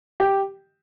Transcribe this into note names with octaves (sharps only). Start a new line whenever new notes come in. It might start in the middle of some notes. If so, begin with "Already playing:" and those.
G4